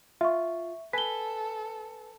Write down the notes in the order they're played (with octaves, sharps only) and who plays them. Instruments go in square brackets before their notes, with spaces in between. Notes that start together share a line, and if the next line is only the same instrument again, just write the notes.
[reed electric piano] F4 [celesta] E5 C#6
[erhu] A4 [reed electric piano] B4 G#5 [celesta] B6 G7